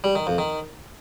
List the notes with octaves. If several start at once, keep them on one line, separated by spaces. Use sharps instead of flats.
G3
D#3
F2
D#3